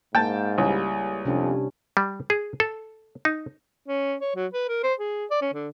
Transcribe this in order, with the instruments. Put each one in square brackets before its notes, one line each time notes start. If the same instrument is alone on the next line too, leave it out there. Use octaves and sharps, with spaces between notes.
[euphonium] G#2 [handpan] A#3 [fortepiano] G5 A5
[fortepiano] C#2 [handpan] G3 E4
[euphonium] F2 [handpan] C3 C#4 D4
[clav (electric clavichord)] G3
G#4
A4
D#4
[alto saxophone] C#4
C#5
F#3
B4
A#4
C5
G#4
D5
C#4
D3